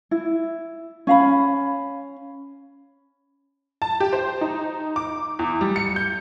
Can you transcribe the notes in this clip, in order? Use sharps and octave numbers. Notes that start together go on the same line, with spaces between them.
E4
C#4 F5 B5
A5
G4
C5
D#4
D6
E2
G3
C#7
G6